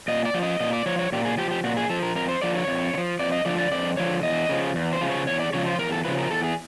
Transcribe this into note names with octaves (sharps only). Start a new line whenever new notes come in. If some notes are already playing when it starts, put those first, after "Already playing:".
A#2 D#5
D5
F3
D#5
A#2 D#5
D5
F3 C#5
C#5
A#2 G4
G#4
F3 G4
G4
A#2 F#4
G#4
F3 A4
A#4
F2 A#4
C5
D3 F3 D5
C#5
F2
D3
F3
F2 D5
D#5
D3 F3 D5
D5
F2 D5
D3 F3 C#5
E2 D#5
C#3 F3
E2
C5
C#3 F3
C#5
E2 C#5
D5
C#3 F3 C#5
C5
E2 A#4
A4
C#3 F3 B4
A#4
E2 A4
G#4